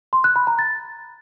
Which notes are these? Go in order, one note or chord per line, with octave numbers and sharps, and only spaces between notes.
C6
F#6
B5
A#5
A6